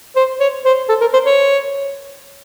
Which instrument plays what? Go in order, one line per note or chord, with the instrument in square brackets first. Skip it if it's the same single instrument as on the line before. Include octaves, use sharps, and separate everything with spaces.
[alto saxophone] C5
C#5
C5
A4
A#4
C5
C#5